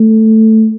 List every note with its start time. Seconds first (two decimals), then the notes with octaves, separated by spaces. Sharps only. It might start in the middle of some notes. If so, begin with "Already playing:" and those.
Already playing: A3